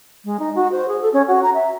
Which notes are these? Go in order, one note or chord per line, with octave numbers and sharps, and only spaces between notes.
G#3
D#4
F#4
C5
G#4
A4
C#4
F#4
A#5
E5